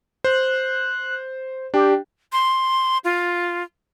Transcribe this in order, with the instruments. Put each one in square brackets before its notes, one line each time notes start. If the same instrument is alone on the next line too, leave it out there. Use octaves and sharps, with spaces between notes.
[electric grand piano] C5 [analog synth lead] F#6
[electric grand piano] D4 [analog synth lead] G4
[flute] C6
F4